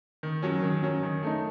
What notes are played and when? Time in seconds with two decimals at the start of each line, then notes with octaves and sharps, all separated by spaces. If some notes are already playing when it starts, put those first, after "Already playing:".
0.23 D#3
0.42 F#3 C#4
0.63 D#3
0.83 F#3 C#4
1.03 D#3
1.23 A3 D#4